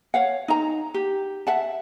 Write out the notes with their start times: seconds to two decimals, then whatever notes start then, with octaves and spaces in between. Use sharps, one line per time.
0.14 C#5 F5 F#5
0.48 D#4 A#5
0.94 G4
1.47 E5 F#5 A5